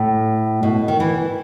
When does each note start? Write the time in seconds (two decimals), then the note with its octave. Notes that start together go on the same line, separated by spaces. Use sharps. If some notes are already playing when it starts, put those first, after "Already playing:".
Already playing: A2
0.63 B2
0.88 D#3
1.00 E3